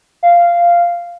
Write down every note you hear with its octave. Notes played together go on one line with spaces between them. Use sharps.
F5